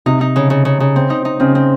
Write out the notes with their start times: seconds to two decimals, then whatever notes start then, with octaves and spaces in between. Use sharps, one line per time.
0.06 C3 D#4
0.21 D#4
0.36 C#3
0.50 C#3
0.65 C#3
0.80 C#3
0.96 C4
1.10 D#4
1.25 D#4
1.40 C#3 C4
1.55 C4